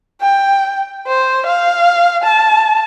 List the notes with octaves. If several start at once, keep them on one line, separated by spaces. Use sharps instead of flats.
G5
C5
F5
A5